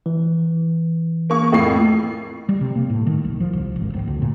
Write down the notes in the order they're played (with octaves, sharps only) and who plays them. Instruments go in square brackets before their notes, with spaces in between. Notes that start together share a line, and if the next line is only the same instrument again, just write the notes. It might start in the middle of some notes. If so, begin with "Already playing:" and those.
[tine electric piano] E3
[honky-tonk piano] A#3 C#6
F2 A2 C7
[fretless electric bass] G3
C3
A#3
A2
D#3
B1
F3
C2
G#1
D1
D2
A#2